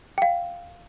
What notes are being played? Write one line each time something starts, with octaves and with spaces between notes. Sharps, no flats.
F5 G5